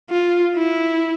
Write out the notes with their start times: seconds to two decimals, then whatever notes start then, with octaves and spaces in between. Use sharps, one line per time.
0.10 F4
0.55 E4